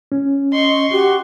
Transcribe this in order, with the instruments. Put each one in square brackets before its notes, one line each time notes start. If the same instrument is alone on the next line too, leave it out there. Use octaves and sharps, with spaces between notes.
[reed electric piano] C#4
[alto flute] D#5 [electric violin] C6 C#6
[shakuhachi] F#4 [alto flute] G4